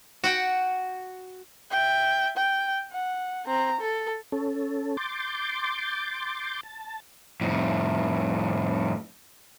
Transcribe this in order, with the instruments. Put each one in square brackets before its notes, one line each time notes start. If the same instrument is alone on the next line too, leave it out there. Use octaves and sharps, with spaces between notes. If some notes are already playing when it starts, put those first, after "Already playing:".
[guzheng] F#4 F#5 G5
[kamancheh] E5 G5
G5
F#5
C4 A#5
A4
[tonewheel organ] C#4 A4
C6 D6 G6 A6
A5
[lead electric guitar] F2 A2